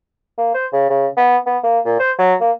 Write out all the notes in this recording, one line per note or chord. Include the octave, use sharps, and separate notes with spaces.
A#3
C5
C#3
C#3
B3
B3
A#3
A#2
C5
F#3
A#3